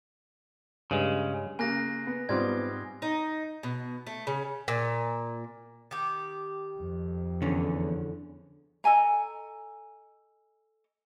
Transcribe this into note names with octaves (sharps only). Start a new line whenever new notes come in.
G2 C#3 G#3
C#3 A#3 G#5 F#6 A#6
B3
G#2 G3 B3 C4 F4 D5 G#6
D#4
B2
A3
C#3
A#2
D#3 G4
F2
E2 D3 C#4
A4 D#5 G#5 A#5